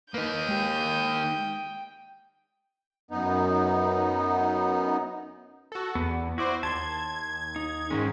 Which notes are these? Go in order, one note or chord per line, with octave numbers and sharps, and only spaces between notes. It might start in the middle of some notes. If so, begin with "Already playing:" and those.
A#3 D#4 B4 D#6 G6
G#3 G4 G5
F#2 B3 D#4
F#4 A4
E2 B3
E4 F#4 C5 D5
D#2 A5 C6 G#6
D#4
G#2 D#3 G#3 C#4